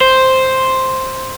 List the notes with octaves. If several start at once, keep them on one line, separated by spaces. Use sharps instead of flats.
C5